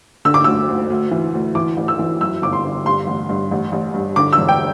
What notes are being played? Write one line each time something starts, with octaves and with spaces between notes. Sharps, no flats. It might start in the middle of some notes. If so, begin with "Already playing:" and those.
D3 E6
D6
D2 E6
D2
D2
E3
D2
E3 D6
A1
E6
E3
F#2 E6
G1 D6
C6
G1
G2 C6
A1
G2
A1
A1
G2
D3 D6
E6
E1
G5